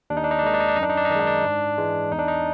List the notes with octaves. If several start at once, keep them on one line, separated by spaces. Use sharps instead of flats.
D#2 D4
D#4
D4
D#4
D4
D#3 G#3 D#4
D4
D#4
D4
F#2 D#4
D4
D#4
D4
D#4
D#3 G#3 D4 D#4
D4
G#2
E3 G#3
E2 D#4
D4
D#4